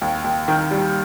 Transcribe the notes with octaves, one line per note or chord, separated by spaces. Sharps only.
D#2
D#2
D#3
G3